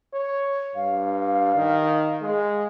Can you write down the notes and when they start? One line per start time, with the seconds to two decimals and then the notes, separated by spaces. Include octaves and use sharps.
0.14 C#5
0.76 G2 F5
1.56 D#3
2.22 G#3